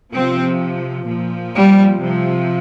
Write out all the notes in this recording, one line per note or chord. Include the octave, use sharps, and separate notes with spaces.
C3 F3 C4
A#2 F3
G3
C3 F3